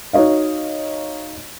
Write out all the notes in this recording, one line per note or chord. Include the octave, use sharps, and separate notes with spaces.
D#4 F#4 C#5 D#5 F5